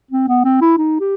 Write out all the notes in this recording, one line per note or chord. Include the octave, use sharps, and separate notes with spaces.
C4
B3
C4
E4
D#4
G4